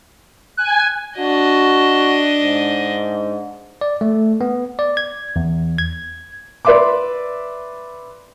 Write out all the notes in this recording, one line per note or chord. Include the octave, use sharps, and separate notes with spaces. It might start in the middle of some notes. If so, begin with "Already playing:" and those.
G#5 F#6
D4 F#4 D#5
G#2
D5
A3
B3
D5
G#6
E2
G#6
B4 D5 E5 C6 D6